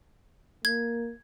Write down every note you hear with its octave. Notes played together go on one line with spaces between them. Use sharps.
A#3 G#6